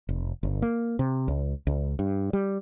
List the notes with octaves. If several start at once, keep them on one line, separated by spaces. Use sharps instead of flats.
F1
G1
A#3
C3
C#2
C#2
G2
G3